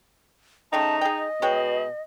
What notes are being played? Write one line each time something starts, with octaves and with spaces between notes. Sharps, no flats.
C#3 A3 D#4 G5 A5
G#4 D#5 G5
B2 G#3 C#5 G5